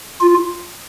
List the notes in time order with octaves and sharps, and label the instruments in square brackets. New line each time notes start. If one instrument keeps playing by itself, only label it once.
[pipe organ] F4